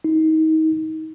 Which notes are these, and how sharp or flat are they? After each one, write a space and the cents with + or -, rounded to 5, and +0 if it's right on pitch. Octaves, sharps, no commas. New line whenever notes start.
D#4 +30